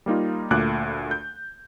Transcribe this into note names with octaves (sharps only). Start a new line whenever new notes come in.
G3 A#3 D#4 F4
D2 A#2 A3 D6 F#6
G6